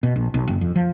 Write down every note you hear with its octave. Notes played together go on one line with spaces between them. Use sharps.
B2
A#1
B1
F#1
F2
F3